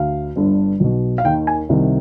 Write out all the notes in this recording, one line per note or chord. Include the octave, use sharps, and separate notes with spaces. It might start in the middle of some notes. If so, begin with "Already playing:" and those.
Already playing: D2 D3 F5
G1 G2 D3
B1 B2
F5
D#2 D#3 G5
G#5
C2 C3 D#3